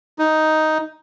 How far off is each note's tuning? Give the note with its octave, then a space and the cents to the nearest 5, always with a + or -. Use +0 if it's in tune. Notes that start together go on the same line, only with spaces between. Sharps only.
D#4 +5